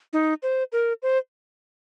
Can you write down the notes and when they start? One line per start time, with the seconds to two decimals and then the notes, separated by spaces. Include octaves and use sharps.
0.13 D#4
0.43 C5
0.72 A#4
1.02 C5